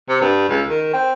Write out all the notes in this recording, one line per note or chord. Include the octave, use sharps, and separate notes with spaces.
C3
G2
C#2
D#3
C4